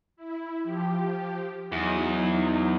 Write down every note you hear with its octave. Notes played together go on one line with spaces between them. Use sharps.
E4
F3 G4
E2 F#3 D#4